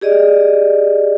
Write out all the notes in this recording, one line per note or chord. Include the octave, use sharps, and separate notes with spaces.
G4 G#4 D5 D#5